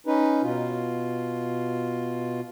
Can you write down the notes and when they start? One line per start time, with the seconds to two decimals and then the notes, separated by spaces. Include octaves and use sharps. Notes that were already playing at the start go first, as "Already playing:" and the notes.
0.07 C#4 D#4 B4
0.42 B2 F4